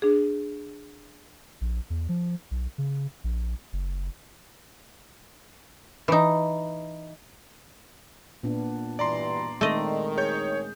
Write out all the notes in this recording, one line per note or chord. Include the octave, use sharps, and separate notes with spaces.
D4 G#4
A#1
E2
F3
B1
C#3
A#1
F#1
E3 D#4
A#2 B3 D4
G2 B2 E3 D5 A#5 C6
D#3 G#3 A3 C4 D#5
G#4 C#5 G6